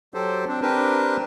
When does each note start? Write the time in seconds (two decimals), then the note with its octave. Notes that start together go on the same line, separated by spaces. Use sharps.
0.14 F#3 G4 A4 C5
0.48 C4 D4
0.62 C4 D4 G4 A#4 B4